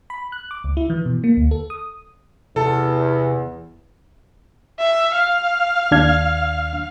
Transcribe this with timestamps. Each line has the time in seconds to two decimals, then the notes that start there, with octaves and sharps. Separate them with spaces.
0.10 B5
0.32 F#6
0.51 D6
0.64 C#2
0.77 E4
0.90 E3
1.06 B2
1.24 A#3
1.37 D2
1.51 A4
1.70 D#6
2.56 E2 C3 A4
4.79 E5
5.14 F5
5.91 D#2 D4 G#6